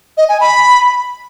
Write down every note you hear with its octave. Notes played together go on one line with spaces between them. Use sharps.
D#5
G#5
B5